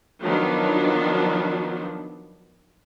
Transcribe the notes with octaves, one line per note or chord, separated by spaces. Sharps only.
D#3 F3 F#3 B3 D4